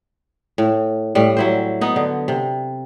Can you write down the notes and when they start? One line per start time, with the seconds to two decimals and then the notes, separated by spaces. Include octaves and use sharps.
0.58 A2
1.15 A2 G3
1.37 F#3 E4 C5
1.81 B3 D#4
1.96 D3
2.28 C3